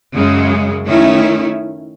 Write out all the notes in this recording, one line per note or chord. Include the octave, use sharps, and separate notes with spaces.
F#2 C#3 G#3
D#3 A3 C#4 E4